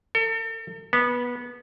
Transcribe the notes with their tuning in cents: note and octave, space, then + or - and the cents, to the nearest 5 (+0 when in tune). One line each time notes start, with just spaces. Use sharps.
A4 +40
B3 -20